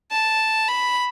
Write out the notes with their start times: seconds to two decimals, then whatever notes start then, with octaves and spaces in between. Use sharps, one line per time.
0.11 A5
0.68 B5